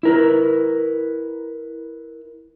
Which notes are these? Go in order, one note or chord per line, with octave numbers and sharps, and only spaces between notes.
E4 A#4 B4